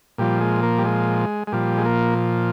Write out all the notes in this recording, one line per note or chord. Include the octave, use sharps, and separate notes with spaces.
A#2 F3 G3
G#3
A#3
G3
G#3
G#3
A#2 F3 G3
G#3
A#3